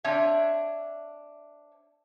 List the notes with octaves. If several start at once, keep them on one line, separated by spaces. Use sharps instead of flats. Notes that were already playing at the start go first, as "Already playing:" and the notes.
C4 D4 C#5 E5